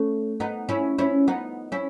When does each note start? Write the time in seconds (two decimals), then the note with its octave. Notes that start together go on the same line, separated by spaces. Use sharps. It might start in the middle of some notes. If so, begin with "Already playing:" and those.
Already playing: A3 C#4
0.40 B3 D#4
0.69 C#4 E4
0.98 C#4 E4
1.28 B3 D#4
1.72 C#4 E4